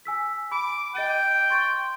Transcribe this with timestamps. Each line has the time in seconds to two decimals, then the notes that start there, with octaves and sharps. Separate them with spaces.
0.05 G#5 E6 B6
0.52 B5 D6
0.95 D#5 G5 A6 D#7
1.50 C6 C#6 A6